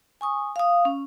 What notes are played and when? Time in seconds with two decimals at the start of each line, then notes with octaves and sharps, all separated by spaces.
0.21 G#5 C#6 D#6
0.56 F5 D#6
0.85 C#4